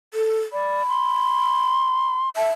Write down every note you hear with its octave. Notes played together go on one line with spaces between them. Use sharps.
A4
D5 B5
C6
E5 A5